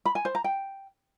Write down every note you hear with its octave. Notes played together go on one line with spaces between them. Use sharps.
B5
G#5
C5
A#5
G5